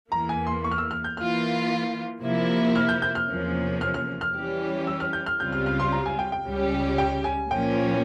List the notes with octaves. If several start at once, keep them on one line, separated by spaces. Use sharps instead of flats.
E2 E3 A#3 A#5
G#5
C6
C#6
F6
E6
F6
G6
E3 A#3 F4 F6
C3 F3 A#3 E4
F6
G6
G6
F6
E2 C3 F3 A#3 C#4
F6
F6
F6
E3 G3 C#4 G4
E6
F6
G6
F6
C#2 C#3 G3 C4 F4 G6
F6
F6
C6
A#5
G#5
G5
G5
C#2 C#3 G3 C#4 G4
G5
G#5
A#2 F3 A#3 C#4 G5